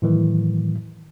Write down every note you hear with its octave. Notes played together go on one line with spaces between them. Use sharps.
A2 D#3 E3 F#3